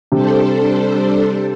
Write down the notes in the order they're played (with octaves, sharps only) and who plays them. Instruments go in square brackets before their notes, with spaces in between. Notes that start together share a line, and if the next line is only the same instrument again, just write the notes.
[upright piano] C3 [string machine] G3 D4 A4 C5